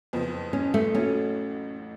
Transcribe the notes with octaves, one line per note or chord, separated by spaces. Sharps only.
F#1 F2 F3 B3
C#4
A3
A1 A2 F#3 C#4